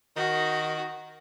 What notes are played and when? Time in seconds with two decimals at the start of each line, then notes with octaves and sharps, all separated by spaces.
0.16 D#3 F#4